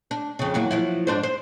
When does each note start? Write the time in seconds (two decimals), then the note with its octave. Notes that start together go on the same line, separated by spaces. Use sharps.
0.11 D4
0.39 F2 C#3
0.54 E2 F#3 A#3
0.71 F3 F#3 E4
1.07 G#2 D4 C5
1.23 C5